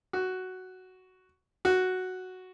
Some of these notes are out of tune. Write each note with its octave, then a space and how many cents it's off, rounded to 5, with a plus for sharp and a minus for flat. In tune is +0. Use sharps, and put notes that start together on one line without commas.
F#4 +5
F#4 +0